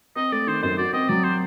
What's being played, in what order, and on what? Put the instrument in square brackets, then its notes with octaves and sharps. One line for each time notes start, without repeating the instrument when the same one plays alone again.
[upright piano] C4 [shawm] D#5
[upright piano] A3 [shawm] D5
[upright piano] D#3 [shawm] C5
[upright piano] F#2 [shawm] C5
[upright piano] F#4 [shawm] D5
[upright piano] C4 [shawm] D#5
[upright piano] F#3 [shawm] D5
[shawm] C5